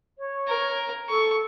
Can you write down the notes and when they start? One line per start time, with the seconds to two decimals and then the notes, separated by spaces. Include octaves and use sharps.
0.18 C#5
0.48 A#4
1.09 A4 C#6